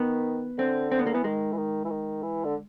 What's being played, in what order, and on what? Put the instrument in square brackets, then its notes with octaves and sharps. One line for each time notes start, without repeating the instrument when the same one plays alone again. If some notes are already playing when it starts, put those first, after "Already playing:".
Already playing: [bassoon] D#3 [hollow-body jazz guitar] B3
[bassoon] D3 [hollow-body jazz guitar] C4
[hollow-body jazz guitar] C4
B3
A#3
[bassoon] E3 [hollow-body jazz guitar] B3
[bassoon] D#3 [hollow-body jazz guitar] G#3
[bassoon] E3
D#3
E3
D#3
E3
D3